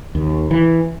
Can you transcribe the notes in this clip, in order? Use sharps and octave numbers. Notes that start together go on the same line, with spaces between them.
D#2
E3